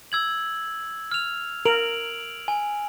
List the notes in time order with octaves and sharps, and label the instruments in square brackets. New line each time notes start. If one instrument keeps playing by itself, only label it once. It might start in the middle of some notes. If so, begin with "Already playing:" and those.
[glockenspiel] E6 G#6 F#7
F6 F7
[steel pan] A#4 [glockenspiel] D7 F7 F#7
[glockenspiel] G#5